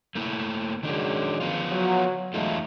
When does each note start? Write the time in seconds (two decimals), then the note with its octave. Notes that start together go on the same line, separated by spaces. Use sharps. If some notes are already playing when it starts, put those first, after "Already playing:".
0.15 A3 A#3 E4
0.83 F#2 D#3 G#3 D4
1.41 F3 B3 F4
1.72 F#3
2.34 E2 F#3 G#3 A3 D#4 F4